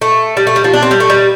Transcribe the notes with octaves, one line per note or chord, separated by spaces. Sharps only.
A3
G3
A3
G3
F3
D4
C4
G3
A3
G3